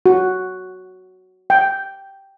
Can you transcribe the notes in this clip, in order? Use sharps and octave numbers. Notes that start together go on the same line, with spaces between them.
F#4
G5